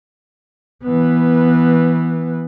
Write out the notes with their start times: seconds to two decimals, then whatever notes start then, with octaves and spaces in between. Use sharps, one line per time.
0.84 E3 B3